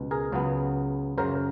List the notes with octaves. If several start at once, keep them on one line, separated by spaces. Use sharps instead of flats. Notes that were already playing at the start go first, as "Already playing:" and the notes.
Already playing: C#2 B2
G#4 A#4
C#2 C#3 F#3 B3
F#2 C#3 F#3 A#4 C5